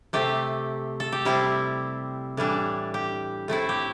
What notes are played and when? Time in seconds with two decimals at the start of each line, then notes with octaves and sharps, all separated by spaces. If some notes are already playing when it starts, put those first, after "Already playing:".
0.13 C3 A3 C4 G4
1.00 A4
1.12 G4
1.25 C3 G3 C4 E4
2.37 A2 E3 G3 D4
2.94 G4
3.48 A2 A3 C4 E4
3.69 G4